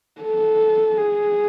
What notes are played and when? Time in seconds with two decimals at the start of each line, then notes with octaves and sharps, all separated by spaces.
0.21 A4
0.97 G#4